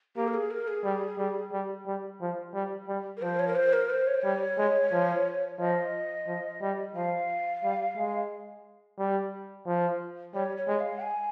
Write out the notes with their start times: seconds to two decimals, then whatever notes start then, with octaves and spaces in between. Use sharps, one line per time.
0.16 A#3 G4
0.28 A#4
0.34 G#4
0.51 A#4
0.68 G#4
0.85 G3
1.18 G3
1.53 G3
1.86 G3
2.21 F3
2.54 G3
2.88 G3
3.17 A#4
3.22 F3 C5
3.39 C#5
3.48 A#4
3.56 C5
3.73 A#4
3.90 C5
4.07 C#5
4.15 C5
4.22 G3 C#5
4.58 G#3
4.92 F3
5.59 F3 D#5
6.27 F3
6.62 G3
6.95 F3 F5
7.64 G3
7.97 G#3
8.98 G3
9.66 F3
10.34 G3 C#5
10.57 C#5
10.68 G#3
10.80 F5
11.02 G#5